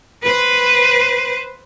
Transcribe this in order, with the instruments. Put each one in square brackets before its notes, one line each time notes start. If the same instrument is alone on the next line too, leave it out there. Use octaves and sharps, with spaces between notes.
[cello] B4 C5